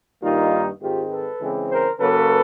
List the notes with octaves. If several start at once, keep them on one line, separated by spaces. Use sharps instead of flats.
G2 D#3 G3 A#3 D#4 F4
G#2 D#3 G#3 C4 F4 G4
A4 B4
C#3 E3 G#3 C4
A#4 C5
C#3 F#3 A#3 A4 B4